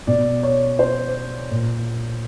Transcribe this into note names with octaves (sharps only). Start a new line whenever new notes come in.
B2 D5
C#5
C5
A#2